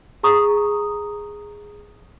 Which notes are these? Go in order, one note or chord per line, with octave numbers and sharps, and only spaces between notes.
G#4 A#5 C#6 D#6